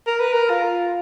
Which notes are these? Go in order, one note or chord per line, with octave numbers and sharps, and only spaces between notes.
A#4
B4
A#4
F4